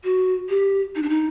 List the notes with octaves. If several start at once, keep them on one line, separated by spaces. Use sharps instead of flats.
F#4
G4
D#4
D4
D#4